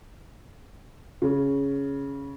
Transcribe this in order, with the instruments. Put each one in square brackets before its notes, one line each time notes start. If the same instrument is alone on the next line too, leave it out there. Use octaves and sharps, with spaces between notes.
[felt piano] C#3